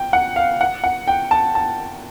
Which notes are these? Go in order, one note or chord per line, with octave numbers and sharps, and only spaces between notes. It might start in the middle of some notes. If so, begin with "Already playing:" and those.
Already playing: G5
F#5
F5
F#5
F#5
G5
A5
A5